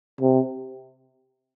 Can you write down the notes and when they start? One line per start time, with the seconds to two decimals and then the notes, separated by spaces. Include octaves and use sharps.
0.21 C3